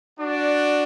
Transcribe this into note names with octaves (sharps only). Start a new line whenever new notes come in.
D4 F#4 D5